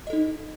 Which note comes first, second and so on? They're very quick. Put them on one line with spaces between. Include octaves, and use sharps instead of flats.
D#5 A4 D#4